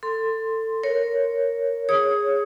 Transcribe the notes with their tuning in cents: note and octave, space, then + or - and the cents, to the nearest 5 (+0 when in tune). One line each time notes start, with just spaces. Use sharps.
A4 +20 C6 -5
A#4 +0 C#5 +0
G#4 -10 C#5 +0 D#6 +15